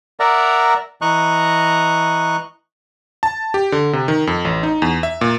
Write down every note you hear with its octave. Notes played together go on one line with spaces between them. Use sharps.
A#4 D5 E5 F#5 A#5
E3 D#5 A#5 C#6 F#6
A5
G4
D3
C3
D#3
F2
A1
D#4
E2
E5
A#2